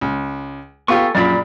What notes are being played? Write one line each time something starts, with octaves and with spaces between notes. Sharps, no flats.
C#2
B3 F4 G4 A4 G#5 C#6
A#1 F#2 A#2 D5 B5